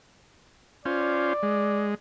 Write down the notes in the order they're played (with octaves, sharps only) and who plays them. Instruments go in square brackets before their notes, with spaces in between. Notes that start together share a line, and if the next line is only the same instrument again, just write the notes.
[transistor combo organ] C#4 F4 C5 [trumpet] D5
[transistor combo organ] G#3